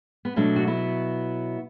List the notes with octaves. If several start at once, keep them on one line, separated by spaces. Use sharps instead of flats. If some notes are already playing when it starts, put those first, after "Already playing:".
B3
B2 F#3 A3 D4
F#4
B3 E4